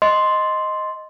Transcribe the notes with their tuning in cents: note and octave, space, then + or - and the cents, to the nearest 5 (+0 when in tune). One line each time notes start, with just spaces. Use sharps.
D#5 +0 C6 +0